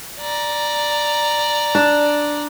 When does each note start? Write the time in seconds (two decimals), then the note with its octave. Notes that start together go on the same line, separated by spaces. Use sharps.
0.21 D5 A#5
1.75 D4